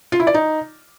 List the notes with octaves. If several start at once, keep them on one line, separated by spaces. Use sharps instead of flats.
F4
E4
D5
D#4